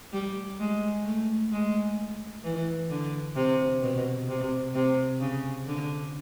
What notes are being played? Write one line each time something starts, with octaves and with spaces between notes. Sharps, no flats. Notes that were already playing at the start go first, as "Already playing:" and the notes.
G3
G#3
A3
G#3
E3
D3
C3
B2
C3
C3
C#3
D3